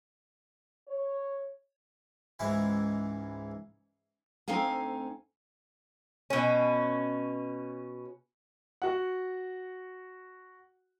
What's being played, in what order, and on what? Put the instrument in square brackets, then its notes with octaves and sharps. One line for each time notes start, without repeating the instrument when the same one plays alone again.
[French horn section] C#5
[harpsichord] C#2 G#2 E3 E4 G#5
[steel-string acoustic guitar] D2 C4 D#4 A4 F5 G#5
[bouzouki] B2 C#4
[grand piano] F#4 F#5